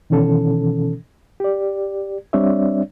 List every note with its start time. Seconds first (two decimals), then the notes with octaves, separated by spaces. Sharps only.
0.10 B2 D#3 E3 C#4 A4
1.40 G4 D5
2.33 G3 C4 D4 C#5 D5 E5